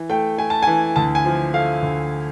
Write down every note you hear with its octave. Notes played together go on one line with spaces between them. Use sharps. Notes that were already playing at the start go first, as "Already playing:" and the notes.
Already playing: E3
A3 G5
A3 G#5
A5
E3 G#5
D2 A5
G#5
F3
A3 F5
D2